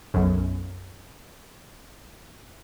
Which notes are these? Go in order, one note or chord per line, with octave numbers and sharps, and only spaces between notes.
B1 F#2